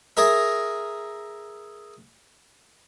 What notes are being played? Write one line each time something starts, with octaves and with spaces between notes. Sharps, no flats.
G#4 A#4 E5